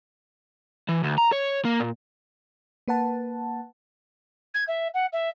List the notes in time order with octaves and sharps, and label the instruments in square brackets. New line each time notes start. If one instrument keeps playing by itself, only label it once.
[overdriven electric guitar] E3
D2
A#5
C#5
A#3
A#2
[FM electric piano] A#3 B4 F#5 A5
[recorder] G#6
E5
F#5
E5